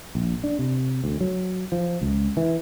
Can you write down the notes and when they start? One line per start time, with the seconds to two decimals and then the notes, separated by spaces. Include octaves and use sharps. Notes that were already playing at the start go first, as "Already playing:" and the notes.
0.15 A#1
0.44 D4
0.59 C3
1.04 D2
1.21 F#3
1.72 F3
2.01 C#2
2.37 E3